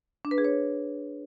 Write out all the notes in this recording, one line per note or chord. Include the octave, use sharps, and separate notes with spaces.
D4
B4
G#4
C#5